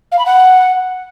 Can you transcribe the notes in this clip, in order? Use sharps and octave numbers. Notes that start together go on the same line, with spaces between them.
F5
B5
F#5